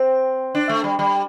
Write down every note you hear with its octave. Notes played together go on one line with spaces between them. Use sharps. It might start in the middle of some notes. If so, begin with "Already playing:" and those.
Already playing: C4
D4
A3
G3
G3